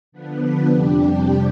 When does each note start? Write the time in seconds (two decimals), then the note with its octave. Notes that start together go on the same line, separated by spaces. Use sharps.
0.12 D3 F3 B3 D4 B4
0.67 F2 C3 G3 D4 G4